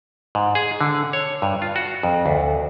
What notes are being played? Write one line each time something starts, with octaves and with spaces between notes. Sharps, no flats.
G#2
G#4
D3
C#5
G2
F4
F#4
F2
D2